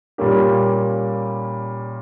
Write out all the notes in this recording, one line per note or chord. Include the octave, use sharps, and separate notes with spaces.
A#2 G3 A#3 C#4 G4